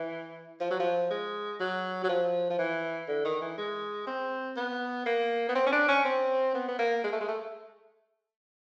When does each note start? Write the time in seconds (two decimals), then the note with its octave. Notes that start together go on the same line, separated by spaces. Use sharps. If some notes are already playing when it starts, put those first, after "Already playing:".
Already playing: E3
0.61 F3
0.71 F#3
0.80 F3
1.11 G#3
1.60 F#3
2.04 F#3
2.09 F3
2.50 F3
2.58 E3
3.08 D3
3.25 D#3
3.41 E3
3.58 G#3
4.07 C4
4.57 B3
5.06 A#3
5.49 B3
5.55 C4
5.66 C#4
5.72 D4
5.88 C#4
6.05 C4
6.54 B3
6.68 B3
6.79 A#3
7.04 G#3
7.12 A3
7.20 G#3
7.28 A3